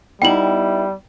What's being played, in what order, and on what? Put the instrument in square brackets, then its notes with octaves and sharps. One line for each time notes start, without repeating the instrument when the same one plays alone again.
[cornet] G3 [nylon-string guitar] B3 D#4 E4 [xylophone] G5 F#7